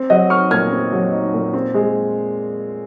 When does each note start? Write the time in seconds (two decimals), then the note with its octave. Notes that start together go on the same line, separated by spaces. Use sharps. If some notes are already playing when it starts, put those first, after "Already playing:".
Already playing: C4
0.10 F#3 D#5 F#5
0.30 D#4 C#6 F6
0.51 A#2 F6 G#6
0.72 C4
0.93 F#3
1.13 D#4
1.34 A#2
1.54 C4
1.74 G#3